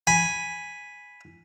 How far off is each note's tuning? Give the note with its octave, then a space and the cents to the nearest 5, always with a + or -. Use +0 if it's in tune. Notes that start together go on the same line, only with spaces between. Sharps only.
G#5 +0 B5 +0